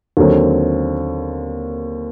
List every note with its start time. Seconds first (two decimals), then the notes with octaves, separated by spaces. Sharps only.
0.17 D#2 D3 F#3 C4